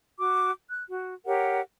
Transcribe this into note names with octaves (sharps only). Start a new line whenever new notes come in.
F#4 D6
F#6
F#4
G4 A#4 C#5 F#5